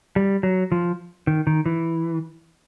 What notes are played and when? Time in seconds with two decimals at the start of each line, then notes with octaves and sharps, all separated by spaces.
0.16 G3
0.43 F#3
0.72 F3
1.27 D#3
1.47 D#3
1.66 E3